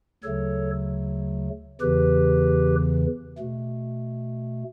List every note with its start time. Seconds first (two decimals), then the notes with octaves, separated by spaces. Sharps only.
0.23 D2 C#3 F#3 A3 A4 C#5
1.81 E2 C#3 E3 G4 B4
3.38 B2 A3